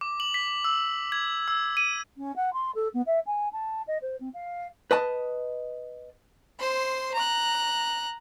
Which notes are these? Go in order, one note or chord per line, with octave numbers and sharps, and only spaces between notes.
D6
F#7
B6
E6
G#6
E6
D#7
C#4
F#5
C6
A4
B3
E5
G#5
A5
D#5
C5
C4
F5
B4 D#5 A5
C5 C6
A#5 F#6